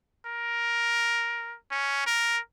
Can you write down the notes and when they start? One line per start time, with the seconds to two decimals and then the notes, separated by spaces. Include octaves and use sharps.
0.26 A#4
1.71 C#4
2.06 A#4